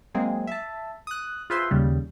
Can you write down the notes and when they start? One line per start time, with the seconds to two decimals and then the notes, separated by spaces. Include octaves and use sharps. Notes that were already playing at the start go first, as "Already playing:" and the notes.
0.15 F#3 G#3 A#3 C4 G#4
0.47 E5 A5
1.07 D#6 F#6
1.50 F4 G#4 B4 C5 E5 C6
1.71 D#2 C#3 G3